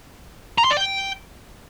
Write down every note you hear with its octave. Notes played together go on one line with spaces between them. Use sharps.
A#5
C6
D5
G5